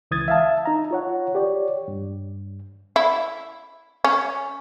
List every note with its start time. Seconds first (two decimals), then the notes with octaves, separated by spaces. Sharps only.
0.11 C#2 E3 D#6 G#6 A6
0.28 E5 F5 A5
0.65 D#4 A#5
0.91 F4 C#5 F#5
1.35 G4 C#5 D5
1.88 G2
2.96 E4
4.04 C#4